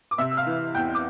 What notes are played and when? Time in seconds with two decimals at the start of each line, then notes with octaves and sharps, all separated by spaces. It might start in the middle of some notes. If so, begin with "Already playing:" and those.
0.11 D6
0.18 C3 E5 E6
0.31 E6
0.37 F5 F6
0.47 E3
0.75 E2 G5 G6
0.95 D6